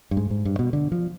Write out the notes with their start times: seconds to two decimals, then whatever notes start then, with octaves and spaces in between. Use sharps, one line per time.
0.11 G2
0.17 G#2
0.31 G#2
0.45 G2
0.59 B2
0.73 D3
0.92 F3